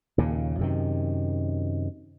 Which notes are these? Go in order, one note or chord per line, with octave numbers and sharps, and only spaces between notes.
D#2 A#2 C#3
F#2 C3 D#3